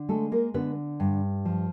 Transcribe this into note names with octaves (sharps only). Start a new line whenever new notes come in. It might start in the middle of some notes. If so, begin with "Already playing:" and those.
Already playing: D3
G#3 A3 A4
A#3 A#4
D3 B3 B4
G2
F3